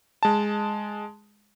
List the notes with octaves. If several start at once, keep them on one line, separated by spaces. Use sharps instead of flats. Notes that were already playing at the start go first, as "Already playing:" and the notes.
G#3 A5